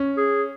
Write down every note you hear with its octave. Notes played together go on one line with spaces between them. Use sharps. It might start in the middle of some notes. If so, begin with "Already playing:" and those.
Already playing: C#4
G#4